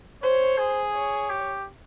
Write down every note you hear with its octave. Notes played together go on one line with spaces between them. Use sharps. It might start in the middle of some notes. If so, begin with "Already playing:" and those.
C5 C#5
G#4
C#5
G4